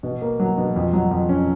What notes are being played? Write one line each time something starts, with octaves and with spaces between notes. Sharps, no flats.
B2
A#3
F#3
B2
F2
F#3
F2
C#4